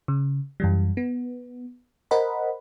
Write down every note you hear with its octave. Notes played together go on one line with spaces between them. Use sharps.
C#3
F#2 E3 G3
B3
A#4 C5 D#5 F#5 B5